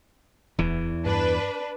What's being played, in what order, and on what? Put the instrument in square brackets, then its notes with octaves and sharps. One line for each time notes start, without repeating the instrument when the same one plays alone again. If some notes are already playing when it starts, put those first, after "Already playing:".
[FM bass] D1 [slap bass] E2 E3
[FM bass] G2 [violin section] D4 B4